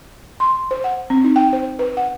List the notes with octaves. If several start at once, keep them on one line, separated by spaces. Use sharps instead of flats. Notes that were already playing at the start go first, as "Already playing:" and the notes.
C6
C5
F#5
C4
D#4
G5
C5
B4
F#5